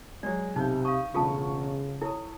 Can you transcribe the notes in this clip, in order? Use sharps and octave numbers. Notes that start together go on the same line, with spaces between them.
F#3 G#3 D5
B1 C3 D#4 G6
F5 C#6 D#6
E1 A1 C#3 F4 A4 A5 C#6
E4 A4 C#5 D#6